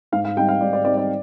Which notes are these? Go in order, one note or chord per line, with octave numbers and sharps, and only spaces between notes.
G#2 F5
F5
G3 C4 D#4 G5
F5
G#2 D5
D5
G3 C4 D#4 D5
D5